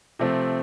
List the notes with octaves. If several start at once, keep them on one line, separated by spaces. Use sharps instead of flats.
C3 F3 A3 C4